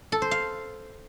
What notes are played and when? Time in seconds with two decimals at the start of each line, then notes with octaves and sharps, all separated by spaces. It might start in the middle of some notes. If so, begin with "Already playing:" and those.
0.12 A4
0.22 C5
0.31 F5